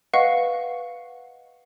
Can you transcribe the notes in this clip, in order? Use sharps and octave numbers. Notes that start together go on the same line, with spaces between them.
B4 D#5 F5 F#5 C#6